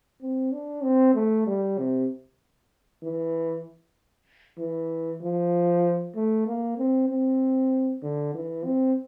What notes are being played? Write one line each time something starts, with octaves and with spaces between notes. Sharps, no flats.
C4
D4
C4
A3
G3
C3
E3
E3
F3
A3
A#3
C4
C4
D3
E3
C4